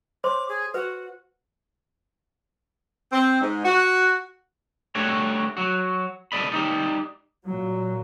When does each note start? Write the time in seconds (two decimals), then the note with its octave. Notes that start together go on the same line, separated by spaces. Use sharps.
0.24 C5 C#5 C6 D6
0.49 G#4
0.74 F#4 B4
3.12 C4
3.41 G#2
3.64 F#4
4.95 G3 A3 D4 F#4 G4 C#5
5.57 F#3 F#4
6.32 A4 D5 D#5 B5
6.52 G3 D#4 G4
7.46 A#2 F#3